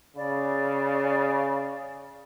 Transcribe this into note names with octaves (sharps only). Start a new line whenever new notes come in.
C#3 D5